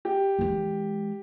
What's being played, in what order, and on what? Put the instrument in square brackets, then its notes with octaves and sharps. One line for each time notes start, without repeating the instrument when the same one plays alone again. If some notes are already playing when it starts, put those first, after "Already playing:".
[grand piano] G4
[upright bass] E3 G#3